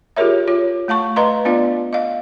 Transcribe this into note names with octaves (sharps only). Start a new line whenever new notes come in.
F4 G4 G#4 A#4 C#5 E5
F4 C#5
A3 F5 A5 C#6
B4 D#5 F5 A#5 C6
B3 D4 F4 D5 F5
D#5 F5